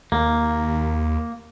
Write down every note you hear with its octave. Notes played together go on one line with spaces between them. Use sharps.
D#2 A#3